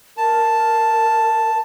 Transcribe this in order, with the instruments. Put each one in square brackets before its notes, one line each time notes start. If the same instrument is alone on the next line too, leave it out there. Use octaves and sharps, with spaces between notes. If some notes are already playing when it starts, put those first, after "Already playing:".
[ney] A#4 [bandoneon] A5